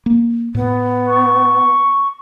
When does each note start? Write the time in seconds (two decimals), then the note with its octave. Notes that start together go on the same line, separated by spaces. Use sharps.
0.06 A#3
0.55 A2 B3
1.08 C#6